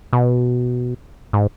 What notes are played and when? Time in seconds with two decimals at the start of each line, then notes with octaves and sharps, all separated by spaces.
0.13 B2
1.33 G#2